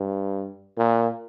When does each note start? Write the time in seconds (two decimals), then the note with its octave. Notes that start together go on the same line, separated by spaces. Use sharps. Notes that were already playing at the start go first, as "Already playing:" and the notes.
Already playing: G2
0.77 A#2